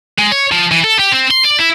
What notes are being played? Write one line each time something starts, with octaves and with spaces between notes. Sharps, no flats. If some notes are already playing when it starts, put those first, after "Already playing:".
G#3
C#5
F3
E3
A4
G4
C4
C6
D5
E4